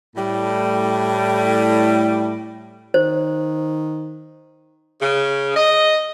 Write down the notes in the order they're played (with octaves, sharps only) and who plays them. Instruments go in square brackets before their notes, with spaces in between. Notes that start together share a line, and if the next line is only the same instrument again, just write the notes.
[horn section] A2 G3
[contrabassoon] D#3 [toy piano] C5
[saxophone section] C#3
D#5